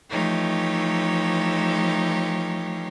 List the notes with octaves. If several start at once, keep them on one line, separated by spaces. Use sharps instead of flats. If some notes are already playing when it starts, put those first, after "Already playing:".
E3 F3 A3 D#4 G4 C#5